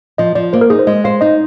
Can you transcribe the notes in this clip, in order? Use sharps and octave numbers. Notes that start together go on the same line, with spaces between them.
F3 D#5
F3 D5
A#3 C5
A#4
D#4 G#4
C5
G#3 D#5
C5 F5
D#4 D#5